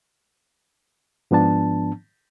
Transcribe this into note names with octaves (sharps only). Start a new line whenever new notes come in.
G#2 F3 B3 D4 A5